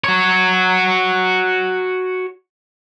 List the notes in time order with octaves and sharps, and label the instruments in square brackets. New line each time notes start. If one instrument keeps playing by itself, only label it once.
[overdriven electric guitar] F#4 C#5